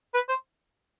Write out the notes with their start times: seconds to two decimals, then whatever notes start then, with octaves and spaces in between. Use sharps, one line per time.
0.14 B4
0.29 C5